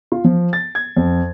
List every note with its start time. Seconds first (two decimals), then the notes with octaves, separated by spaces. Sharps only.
0.12 F4
0.24 F3
0.53 A6
0.75 G#6
0.97 F2